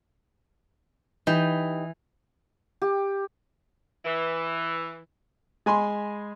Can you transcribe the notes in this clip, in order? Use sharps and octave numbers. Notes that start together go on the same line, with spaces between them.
E3 D#4 G4 B4
G4
E3
G#3 G#5 B5 C6